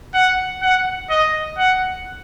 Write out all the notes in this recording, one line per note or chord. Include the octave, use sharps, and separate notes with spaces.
F#5
F#5
D#5
F#5